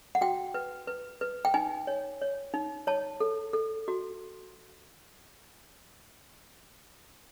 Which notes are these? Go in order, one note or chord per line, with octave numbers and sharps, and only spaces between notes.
F#5
F#4 G5
B4
B4
B4
G5
D#4 G#5
C#5
C#5
D#4
C#5 A5
A4
A4
F#4